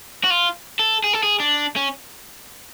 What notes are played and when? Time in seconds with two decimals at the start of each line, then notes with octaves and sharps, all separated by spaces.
0.24 F#4
0.30 F4
0.79 A4
1.04 G#4
1.13 A4
1.23 G#4
1.40 D4
1.76 C#4